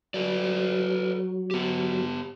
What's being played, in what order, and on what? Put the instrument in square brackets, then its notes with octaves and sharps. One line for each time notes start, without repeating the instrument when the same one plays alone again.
[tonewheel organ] F#3 [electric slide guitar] A4 B4 D5
[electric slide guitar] B3 G4